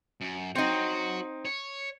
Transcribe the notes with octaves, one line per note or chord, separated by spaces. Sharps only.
F#2
C4 D#4 F#4 C#5
C#5